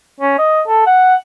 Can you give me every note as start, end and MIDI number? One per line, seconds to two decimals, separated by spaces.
0.20 0.35 61
0.38 0.61 75
0.67 0.85 69
0.86 1.15 78